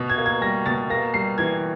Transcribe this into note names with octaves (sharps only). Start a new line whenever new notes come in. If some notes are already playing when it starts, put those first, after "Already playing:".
Already playing: B2
G#6
A#3
G#6
G3 A#6
B2 A6
A#3 A#6
G3 C7
E3 G#6